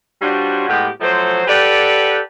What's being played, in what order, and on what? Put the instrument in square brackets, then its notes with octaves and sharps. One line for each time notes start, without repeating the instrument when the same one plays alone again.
[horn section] G3 D4 F4 F#4 C5 C#5
A2 G#3 B3 G4
F3 F#3 A3 C5
G4 A4 B4 D5 F#5 G5